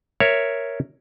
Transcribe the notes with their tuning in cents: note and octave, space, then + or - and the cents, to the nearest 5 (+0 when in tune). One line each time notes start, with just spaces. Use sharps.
A#4 +0 C#5 +0 E5 +0